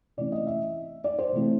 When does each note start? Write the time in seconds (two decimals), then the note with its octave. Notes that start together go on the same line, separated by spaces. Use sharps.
0.17 C3 E3 A3 C#4 D5
0.32 D#5
0.47 E5
1.04 D5
1.19 C5
1.32 C3 E3 A3 C4